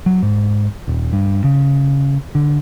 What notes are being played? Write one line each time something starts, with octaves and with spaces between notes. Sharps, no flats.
F#3
G#2
D#1
G2
C#3
D3